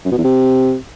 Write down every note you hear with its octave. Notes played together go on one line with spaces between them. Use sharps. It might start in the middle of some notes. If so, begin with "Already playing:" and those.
F#2
B2
E2
C3